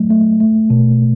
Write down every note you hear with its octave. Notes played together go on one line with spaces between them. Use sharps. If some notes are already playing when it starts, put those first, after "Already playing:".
Already playing: F#3 A3
A3
A3
B2